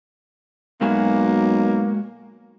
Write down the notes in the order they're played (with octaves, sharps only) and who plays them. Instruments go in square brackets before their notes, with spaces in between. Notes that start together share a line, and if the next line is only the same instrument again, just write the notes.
[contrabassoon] B1 [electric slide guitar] G#3 F#4 G#5 [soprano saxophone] A#3